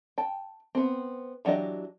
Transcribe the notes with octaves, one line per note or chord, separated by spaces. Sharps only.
G5 A5
B3 C4
E3 F#3 D4 G4 D#5